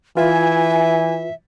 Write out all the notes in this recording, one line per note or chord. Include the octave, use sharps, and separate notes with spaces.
E3 F4 B4 E5 G#5